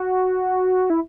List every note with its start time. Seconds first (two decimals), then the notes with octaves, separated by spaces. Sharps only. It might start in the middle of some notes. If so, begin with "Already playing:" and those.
Already playing: F#4
0.90 E4